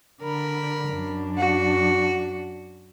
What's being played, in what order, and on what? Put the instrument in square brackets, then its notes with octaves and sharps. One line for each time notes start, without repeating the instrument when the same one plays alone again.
[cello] D3 [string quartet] A#4 B5
[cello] F#2 D4
[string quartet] F#4